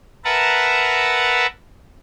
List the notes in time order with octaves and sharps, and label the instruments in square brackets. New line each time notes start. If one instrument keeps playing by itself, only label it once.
[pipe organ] A#4 B4 E5 F#5 A5 A#5